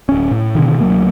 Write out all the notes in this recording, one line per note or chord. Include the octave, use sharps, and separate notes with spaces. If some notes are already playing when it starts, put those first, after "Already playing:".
D1 C#4
A2
B2 D3 D#3
D2 F#3 A3 A#3